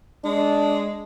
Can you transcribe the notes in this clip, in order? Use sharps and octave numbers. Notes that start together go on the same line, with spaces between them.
G#3 D4